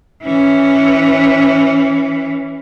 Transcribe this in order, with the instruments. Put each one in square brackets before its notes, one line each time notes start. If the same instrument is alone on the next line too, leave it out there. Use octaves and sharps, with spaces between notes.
[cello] E3 C#4